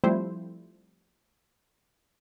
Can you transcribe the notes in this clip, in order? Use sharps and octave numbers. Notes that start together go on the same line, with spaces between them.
F3 G3 A3 C4 E4 C5